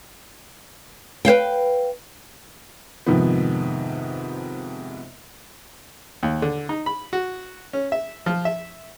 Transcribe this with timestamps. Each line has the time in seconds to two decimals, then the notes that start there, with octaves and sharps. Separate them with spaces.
1.25 B4 C5 F5 G5
3.06 F2 G#2 C3 D#3 F3 B3
6.23 D#2
6.42 D3
6.69 D#4
6.86 B5
7.13 F#4
7.73 C#4
7.92 E5
8.26 F3
8.45 E5